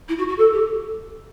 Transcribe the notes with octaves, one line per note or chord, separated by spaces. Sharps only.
E4
F#4
F#4
A4
G4